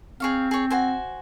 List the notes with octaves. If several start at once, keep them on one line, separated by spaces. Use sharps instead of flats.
C4 G#4 C#5 F5
G#4 C#5
F#4 C5 G#5